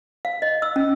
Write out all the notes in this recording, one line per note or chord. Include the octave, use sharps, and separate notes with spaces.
F5
D#5
E6
C#4